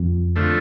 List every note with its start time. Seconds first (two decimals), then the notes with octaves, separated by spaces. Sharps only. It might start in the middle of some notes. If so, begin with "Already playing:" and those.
Already playing: F2
0.36 D3 F3 A3